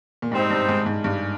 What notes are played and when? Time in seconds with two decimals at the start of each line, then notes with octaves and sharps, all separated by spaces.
0.22 A#2
0.31 G#2 C3 G3 C4 D#4
0.50 G2
0.69 G#2
0.86 G#2
1.04 G2